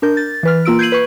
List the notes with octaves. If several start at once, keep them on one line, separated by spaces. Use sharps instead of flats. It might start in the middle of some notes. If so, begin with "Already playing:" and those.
D4 A#4 G6
A6
E3 B4 F6
A#3 F4 E6 D7
G6 G#6 C7 D#7 F#7
B4 C#6